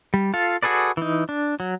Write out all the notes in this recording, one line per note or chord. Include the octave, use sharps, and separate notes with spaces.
G3
F4 A4 F5
F#4 G#4 A4 B4 D5
E3 D#4
D4
F#3